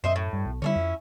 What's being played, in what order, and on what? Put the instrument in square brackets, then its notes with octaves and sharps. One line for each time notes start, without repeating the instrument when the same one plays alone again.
[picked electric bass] F#2 [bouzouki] C5 D#5 E5
[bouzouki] A2
[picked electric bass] G2
B1
[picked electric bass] D3 F#3 G3 [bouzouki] C#4 D4 E4
[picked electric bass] F2